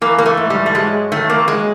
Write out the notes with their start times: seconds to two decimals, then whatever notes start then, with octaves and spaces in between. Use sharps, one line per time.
0.01 E3 A#3
0.18 A#3
0.26 A3
0.37 G#2
0.50 G3
0.66 A3
0.75 F#3 G#3
1.12 D#3 A3
1.30 A#3
1.48 F#3 G#3